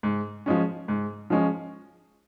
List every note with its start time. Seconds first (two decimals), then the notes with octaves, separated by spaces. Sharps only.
0.03 G#2
0.46 F3 G#3 C#4
0.88 G#2
1.30 F3 G#3 C#4